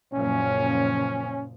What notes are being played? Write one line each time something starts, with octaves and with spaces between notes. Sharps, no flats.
F#1 A#2 F3 C#4